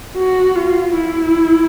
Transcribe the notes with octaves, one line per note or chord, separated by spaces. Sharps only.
F#4
F4
E4